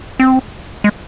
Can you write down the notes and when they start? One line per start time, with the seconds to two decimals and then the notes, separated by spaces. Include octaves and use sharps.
0.20 C4
0.84 G#3